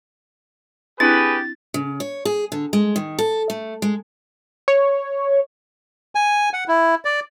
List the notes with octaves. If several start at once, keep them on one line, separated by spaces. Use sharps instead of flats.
C4 D4 E4 G4 G#4 B4 A6
C#3
C#5
G#4
D3
G#3
D#3
A4
A3
G#3
C#5
G#5
F#5
E4
D5